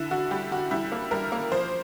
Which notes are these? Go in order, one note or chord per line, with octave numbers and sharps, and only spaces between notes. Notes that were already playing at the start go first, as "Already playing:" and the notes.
Already playing: D3 E4
D3 F#4
G3 G4
D3 F#4
G3 E4
A#3
G3 A#4
A#3
F3 C5